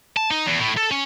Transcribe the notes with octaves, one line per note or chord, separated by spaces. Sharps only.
A5
D#4
E2
A2
A4
C#4